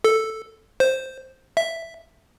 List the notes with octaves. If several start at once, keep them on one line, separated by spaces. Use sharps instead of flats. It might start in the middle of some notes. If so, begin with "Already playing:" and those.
A4
C5
E5